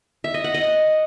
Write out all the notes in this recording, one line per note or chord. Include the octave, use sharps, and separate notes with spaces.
E5
D#5
F#5
D#5